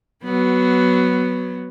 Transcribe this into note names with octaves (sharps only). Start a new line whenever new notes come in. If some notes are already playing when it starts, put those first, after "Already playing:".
F#3 B3